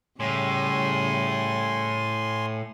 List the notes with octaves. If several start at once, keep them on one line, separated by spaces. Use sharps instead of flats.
A2 C#3 G3 G#5 C6